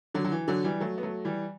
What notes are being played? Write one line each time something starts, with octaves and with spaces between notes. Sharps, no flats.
D3 F#3
F#3
E3
D3 F#3
E3 G3
F#3 A3
B3
F#3 A3
E3 G3